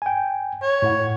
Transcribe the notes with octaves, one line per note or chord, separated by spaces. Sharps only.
G5 G#5
C#5
A2 E4 F#5